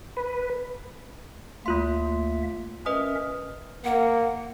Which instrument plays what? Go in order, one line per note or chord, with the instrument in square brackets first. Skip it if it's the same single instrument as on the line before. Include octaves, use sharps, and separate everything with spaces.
[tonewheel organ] B4
[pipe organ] D2 A#3 E5 [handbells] A3 F4 C6
[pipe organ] C#4 A#4 E5 [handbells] B4 D#5 D#6
[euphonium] A#3 [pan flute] F#5